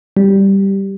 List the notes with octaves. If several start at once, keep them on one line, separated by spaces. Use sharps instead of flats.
G3